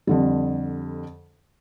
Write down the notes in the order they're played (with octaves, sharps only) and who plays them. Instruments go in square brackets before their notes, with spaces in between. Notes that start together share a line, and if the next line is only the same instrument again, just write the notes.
[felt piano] F2 D3 G3